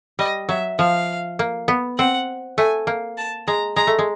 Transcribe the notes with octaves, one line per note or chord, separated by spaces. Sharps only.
G3 D#5
F#3 E5
F3 F5
A#3
B3
C4 F#5
A3 G#5
A#3
A5
G#3 A#5
G#3 A#5
A3
G#3